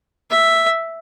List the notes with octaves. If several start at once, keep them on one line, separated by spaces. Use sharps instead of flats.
E5